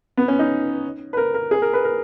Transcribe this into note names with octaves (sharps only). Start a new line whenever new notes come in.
B3
C#4
D#4
B4
A#4
A#4
G#4
A#4
B4
A#4